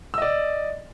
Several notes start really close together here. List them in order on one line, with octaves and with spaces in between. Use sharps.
E6 D#5 D5